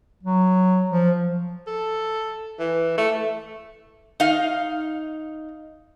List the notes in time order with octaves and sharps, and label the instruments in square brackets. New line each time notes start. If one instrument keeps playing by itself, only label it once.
[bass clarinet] F#3
F3
[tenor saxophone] A4
E3
A3
[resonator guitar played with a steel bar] D#4 F5